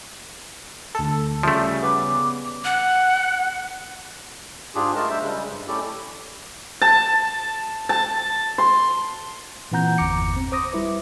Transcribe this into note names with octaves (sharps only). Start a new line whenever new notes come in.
D2 A4
C#3 F3 G3 A3 E5
B3 B4 D6
F#5
G#2 D4 F4 G4 G#4
A3 F4 A#4 D#5 A5
G3 D4 C5 E5
C#3 G3 G#3
G2
A3 C#4 E4 G4 A4 D5
A5
A5
C6
A#2 E3 C4 F#5 A#5 G6
G1 E2 A#5 D6 C#7
C4
C5 D6 D#6 A#6
G3 E4 B4 D6